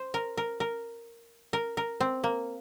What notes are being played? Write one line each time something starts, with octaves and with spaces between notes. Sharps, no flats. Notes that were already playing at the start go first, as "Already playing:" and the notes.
Already playing: C5
A#4
A#4
A#4
A#4
A#4
C4
A#3